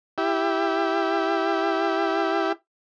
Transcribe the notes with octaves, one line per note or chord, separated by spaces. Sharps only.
E4 G4